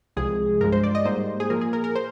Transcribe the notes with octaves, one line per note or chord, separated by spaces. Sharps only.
C2 C3 F3 G#3 G#4
G2 F3 G#3 A#4
C5
D5
D#5
G#2 G3 A#3 C5
G#4
A#2 F3 A#3 A#4
G#4
A#4
A#4
C5